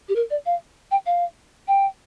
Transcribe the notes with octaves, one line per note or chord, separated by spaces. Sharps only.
G4
A#4
D5
F5
G5
F5
G5